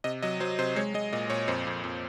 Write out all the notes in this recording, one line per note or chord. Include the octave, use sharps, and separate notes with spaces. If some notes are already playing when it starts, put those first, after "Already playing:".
C3 D#5
F#3 D#5
F#3 C5
C3 C5
G#3 C#5
G#3 D#5
A#2 D#5
A#2 C#5
F2 C5
F2
F2